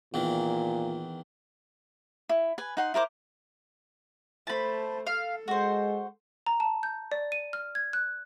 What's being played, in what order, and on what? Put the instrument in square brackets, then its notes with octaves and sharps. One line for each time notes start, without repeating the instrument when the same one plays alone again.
[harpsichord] E2 D#3 E3 [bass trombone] A#2
[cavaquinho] E4
B4 G#5
D#4 F#5 C6
E4 A#4 C5 D6
[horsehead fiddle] A3 C5 [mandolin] A5 B5
[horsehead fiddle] A4 [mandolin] F5
[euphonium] G#3 [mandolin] F#4 C5
[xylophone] A#5
A5
G6
D5
D#7
F6
G#6
F#6